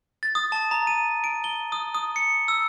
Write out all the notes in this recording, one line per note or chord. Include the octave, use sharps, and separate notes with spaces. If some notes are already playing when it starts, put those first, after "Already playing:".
A6
D#6
A5
A#5
D#7
D7
G7
D#6
D#6
C#7
E6